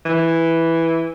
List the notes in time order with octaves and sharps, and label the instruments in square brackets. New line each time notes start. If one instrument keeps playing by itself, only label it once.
[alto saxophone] E3